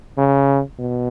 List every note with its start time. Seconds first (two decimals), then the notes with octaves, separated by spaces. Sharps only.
0.18 C#3
0.79 B2